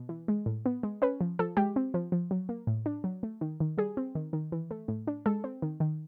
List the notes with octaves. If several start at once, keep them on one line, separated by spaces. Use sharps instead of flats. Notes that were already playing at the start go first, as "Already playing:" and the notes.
Already playing: B2
E3
G#3
A2
B3
G#3
C#4 B4
F3
F3 A4
G#3 G4
C4
F3
F3
F#3
A#3
A2
D4
F#3
A3
D#3
D#3
G3 G#4
C4
D#3
D#3
E3
A3
A2
D4
G#3 A4
C4
D#3
D#3